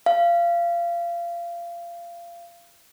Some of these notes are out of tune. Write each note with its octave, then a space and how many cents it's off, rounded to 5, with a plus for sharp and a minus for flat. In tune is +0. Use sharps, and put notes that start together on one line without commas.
F5 -25